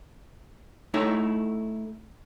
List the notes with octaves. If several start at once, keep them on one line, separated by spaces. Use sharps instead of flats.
A3 D#4 E4 C#5